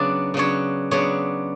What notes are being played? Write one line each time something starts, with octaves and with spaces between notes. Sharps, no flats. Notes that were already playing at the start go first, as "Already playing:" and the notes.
Already playing: C#3 F#3 B3 D4 D5
C#3 F#3 B3 D4 C#5
C#3 F#3 B3 D4 C#5